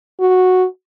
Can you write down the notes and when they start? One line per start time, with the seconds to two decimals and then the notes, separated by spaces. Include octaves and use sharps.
0.20 F#4